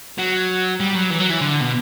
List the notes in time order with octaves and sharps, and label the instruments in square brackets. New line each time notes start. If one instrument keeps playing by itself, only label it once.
[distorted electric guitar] F#3
G3
F#3
E3
F#3
E3
D3
B2